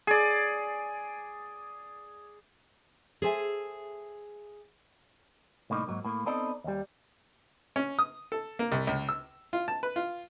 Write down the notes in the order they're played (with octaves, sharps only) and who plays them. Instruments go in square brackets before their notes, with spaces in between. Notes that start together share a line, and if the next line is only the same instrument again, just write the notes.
[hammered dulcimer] G#4 D5
[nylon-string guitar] G#4 A4 C5 E5 G#5
[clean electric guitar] C2 A2 A#3 D#4
G#2 F#3 A#3
A2 A#3
B3 C4 D#4 A4 D5 D#5
D#2 G3
[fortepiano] C#4
D#6
A4
A#3
C2
C#2
E6
F4
A5
B4
F4